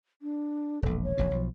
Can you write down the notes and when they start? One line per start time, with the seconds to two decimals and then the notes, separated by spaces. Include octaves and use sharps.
0.22 D4
0.82 E1 A#1 A4
1.03 C#5
1.18 E1 A#1 B2
1.31 B1 F3